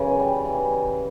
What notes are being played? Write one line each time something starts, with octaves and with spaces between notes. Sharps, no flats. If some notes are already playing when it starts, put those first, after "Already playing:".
Already playing: F#2 C#3 E3
G3
E3